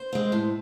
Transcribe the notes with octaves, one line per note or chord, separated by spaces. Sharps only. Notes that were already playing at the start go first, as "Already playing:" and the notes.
Already playing: C5
G#3 C4
A2